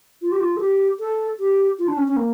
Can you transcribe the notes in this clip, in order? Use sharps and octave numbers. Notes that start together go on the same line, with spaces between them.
F4
G4
F4
A4
G4
A4
G4
F4
D4
C#4
C#4
A#3